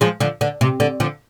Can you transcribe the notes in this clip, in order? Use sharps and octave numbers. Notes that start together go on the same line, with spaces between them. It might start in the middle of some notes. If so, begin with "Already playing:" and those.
F3 G#3
D3 F3
D3
C3
D3
D3 F3